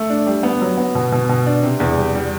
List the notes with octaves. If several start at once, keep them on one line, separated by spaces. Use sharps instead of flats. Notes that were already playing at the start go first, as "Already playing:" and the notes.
Already playing: A3
D4
G3
B3
F#3
B3
B2
B2
B2
D4
C3
E2
G3
G3